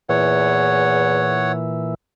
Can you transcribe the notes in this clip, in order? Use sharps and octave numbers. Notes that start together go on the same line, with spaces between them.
E2 A#2 E3 C#5 F#5